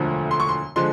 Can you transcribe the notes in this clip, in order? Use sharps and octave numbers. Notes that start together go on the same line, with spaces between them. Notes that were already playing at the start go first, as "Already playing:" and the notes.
Already playing: E1 D2 D3 F3 A3
C6
C#6
C6
D3 F3 G#3 C6